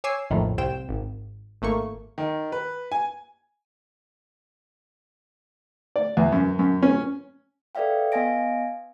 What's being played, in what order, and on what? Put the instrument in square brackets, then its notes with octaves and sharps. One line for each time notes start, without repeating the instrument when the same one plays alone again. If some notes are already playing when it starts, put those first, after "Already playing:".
[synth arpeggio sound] C#5 G#5 D6 E6 C7
A#1 F2 A2 D#3
C2 C4 G5 E7
G#1
G#1 A3 A#3 C#6
[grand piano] D#3
B4
G#5
[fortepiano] D5
E2
F#2
F#2
C#4
[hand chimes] A4 B4 D5 E5 F5 G5
B3 D#5 F5 G#5 A#6 D7